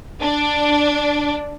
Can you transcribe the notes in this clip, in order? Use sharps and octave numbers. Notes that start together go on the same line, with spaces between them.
D4